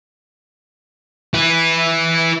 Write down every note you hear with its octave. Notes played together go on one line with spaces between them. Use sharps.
E4 B4